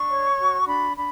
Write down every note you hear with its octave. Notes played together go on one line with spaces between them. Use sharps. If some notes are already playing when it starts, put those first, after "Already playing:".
Already playing: D4 C#6
C#5
F#4
D4 B5
D4 B5